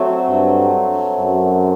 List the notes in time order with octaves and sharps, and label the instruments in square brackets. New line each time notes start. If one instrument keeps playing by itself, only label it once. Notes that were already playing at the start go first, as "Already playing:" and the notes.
Already playing: [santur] F#3 A3 C4
[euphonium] G2
F#2